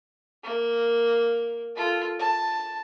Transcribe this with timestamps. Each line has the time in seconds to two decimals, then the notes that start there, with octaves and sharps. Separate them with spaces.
0.44 A#3
1.76 F4 A4
2.19 A5